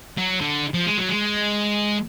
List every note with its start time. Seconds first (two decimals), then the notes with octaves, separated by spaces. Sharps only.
0.18 F#3
0.41 D3
0.74 F3
0.86 G#3
0.97 F#3
1.09 G#3